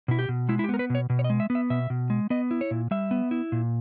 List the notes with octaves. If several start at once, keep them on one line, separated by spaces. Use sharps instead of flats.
B2 E4
G4
B2
G#3 E4
E4
G4
B3 A#4
B4
B2 C#5
B2
C#5
D#5
G#3
E5
B3
E5
B2 E5
B2
G#3
B3 D#5
E4
C#5
A#2
G3 E5
B3
E4
A#2